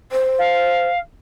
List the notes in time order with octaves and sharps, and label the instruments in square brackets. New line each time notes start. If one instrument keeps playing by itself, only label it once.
[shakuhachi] C5
[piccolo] F5